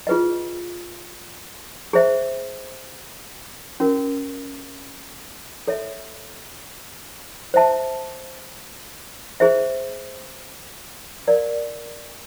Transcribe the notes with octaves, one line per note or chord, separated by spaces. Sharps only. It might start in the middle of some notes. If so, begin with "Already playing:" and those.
F4 G#4 B4 D#5
G#4 C5 E5
C#4 F#4 A#4
A4 C#5 E5
C5 E5 A5
G#4 C5 E5
A#4 D5 F5